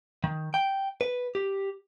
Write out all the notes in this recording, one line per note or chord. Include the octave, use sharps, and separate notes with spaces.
D#3
G5
B4
G4